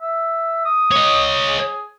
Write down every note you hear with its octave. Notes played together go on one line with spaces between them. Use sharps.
E5
D#6
C#5 D#5
G#4